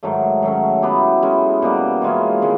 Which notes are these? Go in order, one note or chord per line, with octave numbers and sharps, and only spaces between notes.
G#2 D#3 F#3 A3
D#3 F#3 A3 C#4
F#3 B3 E4 G4
G#3 C#4 E4
B2 G3 A#3
E3 G#3 C#4 F4
C3 D#3 G#3